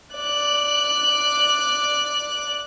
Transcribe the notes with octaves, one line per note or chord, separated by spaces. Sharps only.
D5 F#6